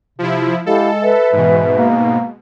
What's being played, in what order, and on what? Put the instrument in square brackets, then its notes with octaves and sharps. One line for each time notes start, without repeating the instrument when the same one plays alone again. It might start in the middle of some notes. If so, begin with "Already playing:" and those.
[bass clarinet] C3 [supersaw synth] F3 E4
[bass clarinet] G#3 [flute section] E4 G4 F5 [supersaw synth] A4
[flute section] B4 E5
[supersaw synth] G#2 B2 [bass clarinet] E3
[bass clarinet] A#3